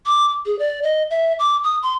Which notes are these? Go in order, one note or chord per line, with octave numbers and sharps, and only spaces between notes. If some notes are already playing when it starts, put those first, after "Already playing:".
D6
G#4
D5
D#5
E5
D6
D#6
C6